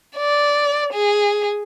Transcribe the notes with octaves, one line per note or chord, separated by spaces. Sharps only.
D5
G#4